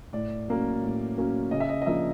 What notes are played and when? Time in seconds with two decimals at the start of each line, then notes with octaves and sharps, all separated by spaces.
0.13 A2 D5
0.48 F#3 A#3 C#4
0.82 A2
1.17 F#3 A#3 C#4
1.51 C#3 D#5
1.60 E5
1.69 D#5
1.82 D#5
1.86 F3 A#3 D4 E5